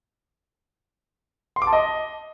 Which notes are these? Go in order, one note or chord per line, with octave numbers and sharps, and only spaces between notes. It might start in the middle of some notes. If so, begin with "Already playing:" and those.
C6
D6
A5
D#5